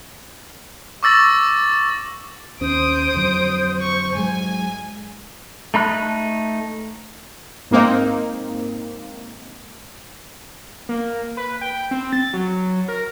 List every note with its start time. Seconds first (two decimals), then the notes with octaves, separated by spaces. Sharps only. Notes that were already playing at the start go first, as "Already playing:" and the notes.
1.03 C#6 D6 E6 A6 A#6 F#7
2.61 D#2 C#4 C5 D#6 D7
3.14 F2 D3 F#3
3.81 C#6
4.15 G#2 F#3 G#3 G#5
5.74 A3 D#4 B5 F#6
7.71 G#2 A#3 C4 D#4
10.89 A#3
11.37 B4
11.61 G5
11.91 C4
12.13 A6
12.33 F#3
12.88 A#4